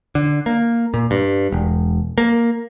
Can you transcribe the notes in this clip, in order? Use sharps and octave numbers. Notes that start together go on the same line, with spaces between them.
D3
A#3
A#2
G2
E1
A#3